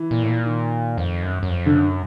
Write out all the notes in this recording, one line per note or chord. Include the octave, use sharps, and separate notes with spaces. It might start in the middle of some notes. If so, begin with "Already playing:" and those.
Already playing: E3
A#2
A2
A#2
D#3
F2
F#2
F#2
F2
D3
F#2